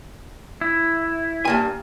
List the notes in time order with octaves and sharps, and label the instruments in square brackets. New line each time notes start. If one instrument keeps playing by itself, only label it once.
[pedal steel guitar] E4
[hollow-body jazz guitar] G2 A#3 G#5